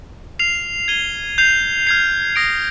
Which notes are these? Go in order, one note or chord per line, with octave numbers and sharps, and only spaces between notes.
F6 C7 F7
G#6 D#7 G7
G6 C7 F7
F6 G#6 C7
D#6 A#6 D7